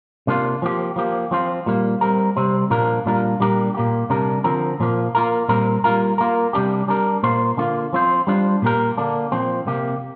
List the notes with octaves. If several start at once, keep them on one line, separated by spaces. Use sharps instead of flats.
C3 A#3 D4 F4
F3 A#3 G4
F3 A#3 G4
F3 C4 F4
A#2 G3 A#3
G3 C4 A#4
C3 G3 C4
A#2 F3 A#3 D4 A#4
A#2 G3 D4 F4 A#4
A#2 G3 D4 G4 A#4
A#2 A#3 G4
C3 G3 D4 A#4
D3 F3 C4 A#4
A#2 F3 A#3
A#3 F4 A#4
A#2 G3 C4 A#4
G3 A#3 F4 A#4
A#3 F4 A#4
C3 G3 D4 G4
G3 D4 A#4
A#2 A#3 F4 C5
D3 A#3 F4
F3 C4 F4 C5
G3 D4 F4 C5
A#2 A#3 G4 A#4
D3 A#3 D4
A#2 F3 C4
C3 A#3 G4